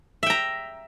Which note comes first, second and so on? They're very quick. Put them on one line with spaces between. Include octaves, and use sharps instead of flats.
E5 G5 A#5